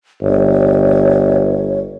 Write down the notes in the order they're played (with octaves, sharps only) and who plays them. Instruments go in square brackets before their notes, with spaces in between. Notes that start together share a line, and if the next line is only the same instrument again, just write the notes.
[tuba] G1 [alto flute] C#5